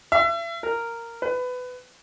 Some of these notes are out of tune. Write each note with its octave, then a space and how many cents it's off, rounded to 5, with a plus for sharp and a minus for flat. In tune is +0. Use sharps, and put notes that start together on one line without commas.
E5 +35
A#4 -10
B4 +20